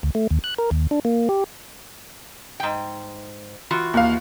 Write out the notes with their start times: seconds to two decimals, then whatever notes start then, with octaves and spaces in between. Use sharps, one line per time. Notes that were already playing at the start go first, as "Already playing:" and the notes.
0.03 D2
0.15 A3
0.31 D#2
0.44 F#6
0.58 A#4
0.71 D#2
0.91 D4
1.05 A#3
1.29 G4
2.60 G#2 G5
3.71 E3 F4 F#4
3.94 D#2 F5